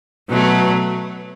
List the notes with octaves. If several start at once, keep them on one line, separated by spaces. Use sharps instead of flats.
B2 F#3 A3